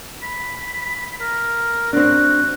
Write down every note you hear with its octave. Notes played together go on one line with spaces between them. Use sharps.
B5
A#4
C4 D4 F#4